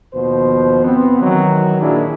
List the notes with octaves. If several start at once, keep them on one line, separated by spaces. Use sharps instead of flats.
D#2 B2 F3 C5
B3 C4
D#3 E3 F#3
A#2 D#3 A#3 D4 E4 G#4